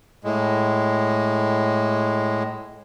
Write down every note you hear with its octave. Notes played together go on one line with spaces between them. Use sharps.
A2 G#3